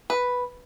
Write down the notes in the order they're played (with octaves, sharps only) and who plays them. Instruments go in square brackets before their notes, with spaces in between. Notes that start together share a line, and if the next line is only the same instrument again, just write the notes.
[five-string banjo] B4